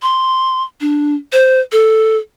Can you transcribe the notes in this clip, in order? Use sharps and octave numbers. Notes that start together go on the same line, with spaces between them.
C6
D4
C5
A4